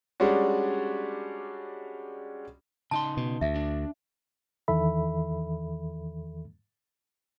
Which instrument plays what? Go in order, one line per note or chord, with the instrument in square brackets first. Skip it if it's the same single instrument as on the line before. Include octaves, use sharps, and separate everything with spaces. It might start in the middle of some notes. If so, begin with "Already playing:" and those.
[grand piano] G3 G#3 C#4 D4 F#4
[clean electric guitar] C#3 D#4 C6 [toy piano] A5
[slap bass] B2
[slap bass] D2 [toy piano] E5
[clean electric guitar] D4
[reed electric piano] E2 D#3 E3 A4 E5 B5